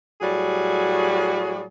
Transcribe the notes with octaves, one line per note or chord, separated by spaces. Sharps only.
A2 F#3 G3 F#4 G#4